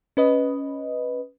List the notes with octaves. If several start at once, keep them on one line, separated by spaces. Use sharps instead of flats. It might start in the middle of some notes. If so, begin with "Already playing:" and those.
C#4 B4 D#5